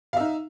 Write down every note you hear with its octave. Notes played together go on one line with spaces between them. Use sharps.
D#4 E5 F5